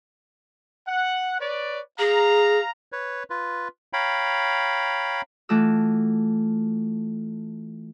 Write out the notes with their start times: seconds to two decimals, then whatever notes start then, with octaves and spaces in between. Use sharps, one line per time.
0.88 F#5
1.39 B4 C#5 D5
1.99 G#4 F5 A#5
2.92 B4 C#5
3.30 F4 B4
3.93 C#5 F5 G5 A#5 B5
5.49 E3 A3 F4 F#4 D6 E6